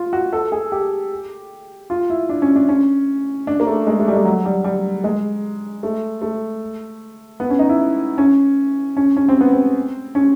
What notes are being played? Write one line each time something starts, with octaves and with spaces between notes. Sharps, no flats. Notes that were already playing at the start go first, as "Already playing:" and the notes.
Already playing: F4
F#4
A4
G#4
G4
F4
E4
D4
C#4
D4
C#4
D4
A#3
A3
G#3
A3
G3
G#3
F#3
G3
G3
G#3
A3
A3
B3
C#4
D#4
E4
C#4
C#4
C#4
C4
B3
C4
C#4